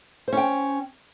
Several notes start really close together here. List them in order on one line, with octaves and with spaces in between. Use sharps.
C5 C#4 G5